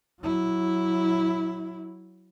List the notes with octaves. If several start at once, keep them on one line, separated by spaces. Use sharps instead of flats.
F#3 E4